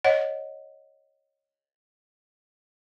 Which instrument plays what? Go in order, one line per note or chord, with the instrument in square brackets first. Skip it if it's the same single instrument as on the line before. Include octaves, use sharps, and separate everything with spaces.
[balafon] C#5 D#5 F#5